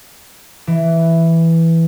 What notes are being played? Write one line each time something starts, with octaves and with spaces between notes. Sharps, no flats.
E3